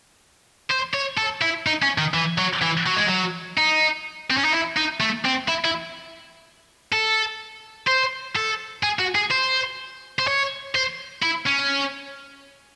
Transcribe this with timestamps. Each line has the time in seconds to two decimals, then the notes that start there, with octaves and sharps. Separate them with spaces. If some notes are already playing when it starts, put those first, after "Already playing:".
0.71 C5
0.94 C#5
1.18 A4
1.42 E4
1.67 D#4
1.82 C#4
1.98 D#3
2.14 E3
2.38 F#3
2.62 E3
2.86 F#3
2.96 G#3
3.07 F#3
3.58 D#4
4.31 C4
4.38 C#4
4.45 D#4
4.53 E4
4.77 D#4
5.01 A3
5.25 C4
5.49 E4
5.65 E4
6.92 A4
7.88 C5
8.36 A4
8.83 G#4
8.99 F#4
9.15 G#4
9.31 C5
10.19 C5
10.27 C#5
10.75 C5
11.22 E4
11.46 C#4